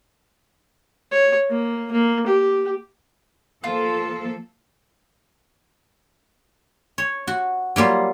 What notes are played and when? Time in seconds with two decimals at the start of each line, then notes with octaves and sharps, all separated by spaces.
1.12 C#5
1.50 A#3
1.91 A#3
2.26 G4
3.64 F3 A#3 F4 A4
6.98 C#5
7.27 F#4
7.76 F#3 G3 A#3 F4